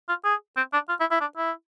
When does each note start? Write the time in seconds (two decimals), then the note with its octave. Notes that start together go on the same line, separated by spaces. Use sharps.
0.09 F4
0.25 G#4
0.57 C4
0.73 D4
0.89 F4
1.00 E4
1.11 E4
1.21 D4
1.37 E4